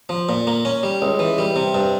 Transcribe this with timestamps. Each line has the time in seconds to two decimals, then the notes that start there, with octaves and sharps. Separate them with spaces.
0.09 F3
0.29 A#2
0.47 A#3
0.65 C#4
0.83 G3
1.02 C#2
1.19 E3
1.38 G3
1.56 C3
1.74 G2